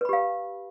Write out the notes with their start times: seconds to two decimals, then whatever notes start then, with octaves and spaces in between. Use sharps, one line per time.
0.01 B4
0.05 B5
0.09 G4
0.13 F5